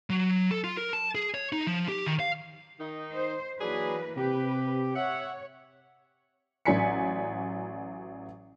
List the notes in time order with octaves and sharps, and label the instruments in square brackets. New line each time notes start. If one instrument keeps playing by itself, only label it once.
[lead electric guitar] F#3
A4
F4
A#4
A5
G#4
C#5
D#4
F3
G4
D#3
F5
[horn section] D#3 D#4
[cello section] C5
[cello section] E3 A#3 B4 [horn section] F#3 D4 G#4
[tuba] C3 [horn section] G4 [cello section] B4
[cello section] C#5 [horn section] E5 F#5
[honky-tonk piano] A1 F#3 D5 G#5 B6 C#7